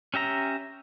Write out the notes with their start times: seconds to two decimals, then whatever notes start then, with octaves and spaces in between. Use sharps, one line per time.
0.14 C#4 G4 E5 A#5